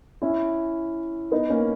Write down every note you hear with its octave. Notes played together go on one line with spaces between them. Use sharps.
C#4 E4
B3 D#4
A#3 C#4